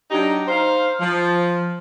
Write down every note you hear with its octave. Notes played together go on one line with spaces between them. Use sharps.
F#3 D4 D#4 G4 G5 A#5
D#4 C5 F5
F3